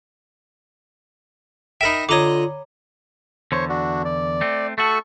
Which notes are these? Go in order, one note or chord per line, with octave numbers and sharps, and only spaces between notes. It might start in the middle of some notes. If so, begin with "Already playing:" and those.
D#4 A#4 E5 G5 B5
D3 F4 C#5 D#5 A#5 D6
E2 D3 C5 C#5
D4 F#4
D5
A3 C4
A3 F#4 A4 C#6